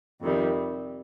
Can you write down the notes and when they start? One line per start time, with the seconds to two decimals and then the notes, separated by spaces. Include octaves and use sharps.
0.20 F2 C3 D#3 G3